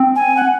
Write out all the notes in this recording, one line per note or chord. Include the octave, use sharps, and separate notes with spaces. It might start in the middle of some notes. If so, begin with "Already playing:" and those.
Already playing: C4
G#5
F#5